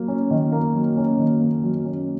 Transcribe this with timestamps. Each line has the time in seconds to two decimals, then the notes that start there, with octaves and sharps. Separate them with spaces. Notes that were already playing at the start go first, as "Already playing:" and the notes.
Already playing: F#3 A#3
0.08 C#4
0.31 D#3
0.52 A#3
0.74 F#3
0.97 C#4
1.19 D#3
1.41 A#3
1.63 F#3
1.86 C#4